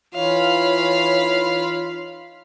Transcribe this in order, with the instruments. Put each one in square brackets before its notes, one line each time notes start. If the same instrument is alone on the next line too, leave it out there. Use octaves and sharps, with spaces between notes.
[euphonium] E3 [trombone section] D#4 F4 [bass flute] C#5 [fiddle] F5 B5